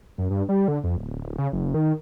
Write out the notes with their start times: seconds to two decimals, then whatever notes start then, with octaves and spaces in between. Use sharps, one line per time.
0.18 F#2
0.30 G2
0.49 G3
0.68 D3
0.84 F2
0.97 D1
1.39 C#3
1.53 F#1
1.74 D#3